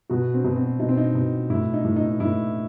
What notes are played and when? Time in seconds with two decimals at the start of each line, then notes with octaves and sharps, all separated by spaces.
0.09 B2 F#4
0.34 C4
0.44 B2
0.56 C4
0.79 B2 D#4
0.89 C4
0.97 D#4
1.15 B2
1.50 A2 E4
1.74 D#4
1.85 A2
1.96 D#4
2.20 A2 E4